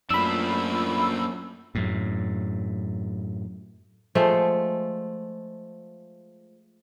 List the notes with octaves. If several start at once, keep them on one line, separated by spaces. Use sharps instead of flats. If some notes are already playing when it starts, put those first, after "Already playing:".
F#2 A3 A#3 D4 F4 B5 E6
F#2 A2
F3 G#3 A3